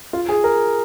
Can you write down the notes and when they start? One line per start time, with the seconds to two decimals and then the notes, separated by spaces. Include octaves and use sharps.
0.13 F4
0.29 G#4
0.44 A#4